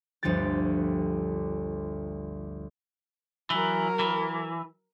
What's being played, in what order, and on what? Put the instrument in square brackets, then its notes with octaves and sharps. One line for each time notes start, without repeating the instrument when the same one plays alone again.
[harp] G1 D2 F3 G3 G4 A6
[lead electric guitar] E3 [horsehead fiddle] F#3 A#4
[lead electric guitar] E3